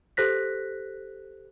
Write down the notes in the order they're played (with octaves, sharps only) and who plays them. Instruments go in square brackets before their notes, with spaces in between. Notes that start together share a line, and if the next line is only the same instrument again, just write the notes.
[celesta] G4 A4 C5 F#6 A#6 B6